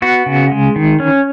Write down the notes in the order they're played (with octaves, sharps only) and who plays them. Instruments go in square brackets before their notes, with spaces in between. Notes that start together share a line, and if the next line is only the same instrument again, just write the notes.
[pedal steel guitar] B3 F#4
C#3
G#3
D#3
C#4